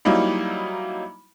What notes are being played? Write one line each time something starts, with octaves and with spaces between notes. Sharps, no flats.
F#3 G3 A#3 D#4 E4